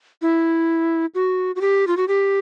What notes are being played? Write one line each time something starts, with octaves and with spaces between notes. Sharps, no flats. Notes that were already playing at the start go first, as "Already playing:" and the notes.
E4
F#4
F#4
G4
F4
F#4
G4